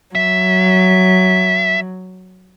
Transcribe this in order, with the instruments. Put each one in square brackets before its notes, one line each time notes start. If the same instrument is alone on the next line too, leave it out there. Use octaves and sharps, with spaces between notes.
[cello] F#3 [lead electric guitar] E5